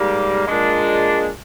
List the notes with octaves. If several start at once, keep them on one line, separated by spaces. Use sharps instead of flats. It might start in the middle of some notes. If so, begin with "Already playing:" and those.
Already playing: G#2 G3 A#3
A#2 G#3 D4